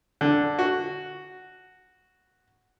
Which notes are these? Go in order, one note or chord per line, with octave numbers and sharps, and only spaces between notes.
D3
F#4